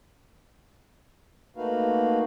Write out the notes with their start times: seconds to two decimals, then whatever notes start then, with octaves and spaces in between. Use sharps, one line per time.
1.57 A3 A#3 D#4 F#4 B4 F5